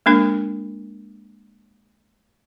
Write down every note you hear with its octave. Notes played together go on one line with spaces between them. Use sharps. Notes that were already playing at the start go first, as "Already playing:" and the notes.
G#3 A#3 D4 A#4